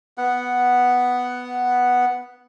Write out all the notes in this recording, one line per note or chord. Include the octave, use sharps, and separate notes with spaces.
B3 F#5